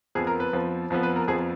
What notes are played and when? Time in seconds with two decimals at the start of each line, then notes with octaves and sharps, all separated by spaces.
0.15 F2 F3 B3 G#4
0.27 A#4
0.40 B4
0.53 F2 F3 B3
0.90 F2 F3 B3
1.03 B4
1.16 A#4
1.27 F2 F3 B3 G#4